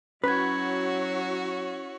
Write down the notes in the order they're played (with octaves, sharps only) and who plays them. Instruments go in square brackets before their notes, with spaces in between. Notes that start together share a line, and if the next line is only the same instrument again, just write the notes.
[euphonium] F#3 [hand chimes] C#4 G#6 [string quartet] E4 F#4 C#5 [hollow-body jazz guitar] B4